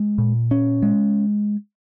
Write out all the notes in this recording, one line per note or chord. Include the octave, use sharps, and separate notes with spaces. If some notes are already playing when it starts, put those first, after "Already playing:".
Already playing: G#3
A#2
C#4
G#3